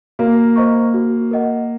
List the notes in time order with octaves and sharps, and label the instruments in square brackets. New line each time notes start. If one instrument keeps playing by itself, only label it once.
[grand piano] A#3 [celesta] F#4
[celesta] C5 D#5 A#5 C#6
F#4
A#4 D#5 F#5